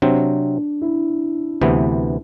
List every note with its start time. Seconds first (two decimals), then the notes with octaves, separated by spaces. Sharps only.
0.02 C3 F#3 C4 D4
0.82 E4
1.61 D2 C3 E3 B3